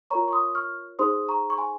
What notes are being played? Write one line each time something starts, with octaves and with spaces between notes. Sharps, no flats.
F4 A#4 C#5 A#5 C#6
C#6
C6 D#6
C#6 F6
D#4 G#4 C5 C6 D#6
A#5 C#6
C#6
G#5 C6